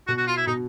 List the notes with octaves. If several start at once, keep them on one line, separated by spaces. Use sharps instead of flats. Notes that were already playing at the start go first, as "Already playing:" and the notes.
B2 F#4
F#4
F4
E4
B2 D#4